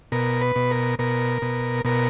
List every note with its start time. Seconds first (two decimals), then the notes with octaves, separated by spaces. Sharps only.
0.12 B2 A#4
0.41 B4
0.56 B2
0.71 A#4
0.99 B2 A#4
1.42 B2
1.85 B2 A#4